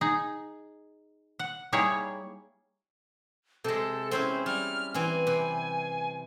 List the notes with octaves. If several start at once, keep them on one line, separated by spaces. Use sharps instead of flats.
D#4 G#4
F#5
G3 A#3 D#4 E4 G#4 C#5
C3 G#3 A4
C4 C#4 E4 C5
G3 F6
E3 C4 G#5
C3 B4